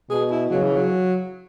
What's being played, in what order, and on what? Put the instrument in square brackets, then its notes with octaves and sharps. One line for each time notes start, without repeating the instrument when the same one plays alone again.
[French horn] B2 [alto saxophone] G#4
[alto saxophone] E4
[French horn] C#3 [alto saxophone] F#3
[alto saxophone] E3
F#3